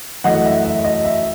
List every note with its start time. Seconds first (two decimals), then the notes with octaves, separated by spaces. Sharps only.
0.24 F#2 E3 A3 D#5 F#5
0.45 E5
0.65 E5
0.85 D#5
1.04 E5